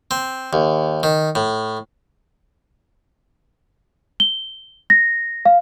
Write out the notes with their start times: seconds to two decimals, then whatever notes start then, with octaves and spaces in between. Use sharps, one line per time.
0.11 C4
0.53 D#2
1.03 D#3
1.35 A2
4.20 G7
4.90 A#6
5.45 F5